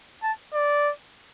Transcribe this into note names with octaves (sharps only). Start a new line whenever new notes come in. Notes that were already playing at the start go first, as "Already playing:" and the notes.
A5
D5